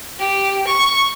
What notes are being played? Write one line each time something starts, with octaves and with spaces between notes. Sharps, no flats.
G4
C#6